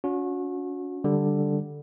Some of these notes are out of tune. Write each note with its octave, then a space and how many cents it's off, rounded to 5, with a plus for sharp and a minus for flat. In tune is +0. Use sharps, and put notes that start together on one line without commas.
C#4 +40 F#4 -30
D3 +0 G3 +0